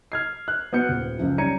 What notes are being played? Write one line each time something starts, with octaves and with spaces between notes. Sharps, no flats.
F6 G#6 C7
F#6
B3 F#4 G6 C#7
D#1
C#2 F#2 F3
G3 C#4 A#5 G#6 C#7 D#7